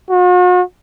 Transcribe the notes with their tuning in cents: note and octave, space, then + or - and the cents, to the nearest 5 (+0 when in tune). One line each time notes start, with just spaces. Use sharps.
F#4 -45